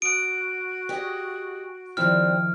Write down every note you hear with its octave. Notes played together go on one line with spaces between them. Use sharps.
F#4 D#6 F#6 D7
G4 G#4 D#5
D#3 F3 G3 C4 D4 E4 F6